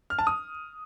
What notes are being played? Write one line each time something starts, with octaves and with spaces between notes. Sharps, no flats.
F6
A5
D#6